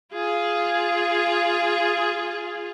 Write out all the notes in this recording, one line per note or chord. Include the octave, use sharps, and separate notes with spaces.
F4 G#4